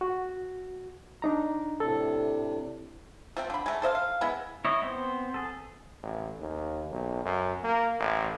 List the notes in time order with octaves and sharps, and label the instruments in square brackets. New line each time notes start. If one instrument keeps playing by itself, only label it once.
[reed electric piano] F#4
D4 D#4 A#5
[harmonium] A2 C3 D4 [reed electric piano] A4
[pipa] F3 A3 C4
D3 B5
G#3 A3
A4 C5 D#5 F5
F5
G#3 B3 E4
[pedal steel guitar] E4 C#5 D#5
B3 C4 C5
G#4 A4
[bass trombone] A1
D#2
B1
F#2
A#3
A1